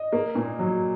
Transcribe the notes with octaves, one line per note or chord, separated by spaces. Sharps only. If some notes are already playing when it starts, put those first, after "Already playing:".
Already playing: D#5
A#3
A#2
F#3